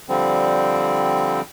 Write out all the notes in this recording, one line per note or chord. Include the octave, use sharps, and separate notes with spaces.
D3 F3 G3 C4